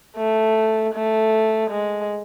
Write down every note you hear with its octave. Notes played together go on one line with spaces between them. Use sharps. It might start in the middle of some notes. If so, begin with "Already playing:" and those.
A3
A3
G#3